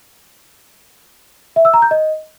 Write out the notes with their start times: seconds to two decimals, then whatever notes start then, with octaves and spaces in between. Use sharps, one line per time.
1.56 E5
1.65 E6
1.74 A#5
1.82 G6
1.91 D#5